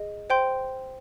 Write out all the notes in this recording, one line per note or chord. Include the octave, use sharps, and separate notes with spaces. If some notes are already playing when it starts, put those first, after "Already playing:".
Already playing: G#4 D#5
C5 G5 C6 G6